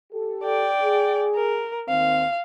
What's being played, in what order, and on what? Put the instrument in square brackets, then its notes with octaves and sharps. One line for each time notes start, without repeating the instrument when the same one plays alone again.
[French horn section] G4 A4
[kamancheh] D5 G5
[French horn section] G#4
[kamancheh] A#4
[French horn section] D#2 D#3 C4 [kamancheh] F5